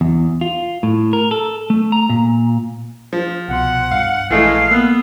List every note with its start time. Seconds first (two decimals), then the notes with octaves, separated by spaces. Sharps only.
0.01 E2
0.41 F4
0.83 A2
1.13 A#4
1.31 A4
1.70 A3
1.92 A#5
2.10 A#2
3.13 F3
3.48 C2 B2 F#5 C6
3.91 G2 F5
4.31 A#1 E3 G#3 A3 D#5 F5
4.71 A#3 B3 E6 F#6